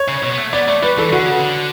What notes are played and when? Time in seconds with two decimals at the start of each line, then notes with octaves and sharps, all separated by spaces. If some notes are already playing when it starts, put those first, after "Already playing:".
Already playing: C#5
0.08 C#3
0.23 B2
0.33 B3
0.38 A3
0.53 B3 D5
0.68 A3 D5
0.82 G3 B4
0.98 E3 A4
1.12 D3 F#4
1.26 C#3
1.39 D3